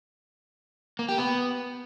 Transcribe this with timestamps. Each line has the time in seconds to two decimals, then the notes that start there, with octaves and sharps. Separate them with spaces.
0.99 A#3
1.09 G4
1.18 B3